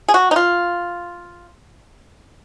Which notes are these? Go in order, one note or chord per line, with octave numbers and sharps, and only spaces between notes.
G#4
F#4
D#4
F4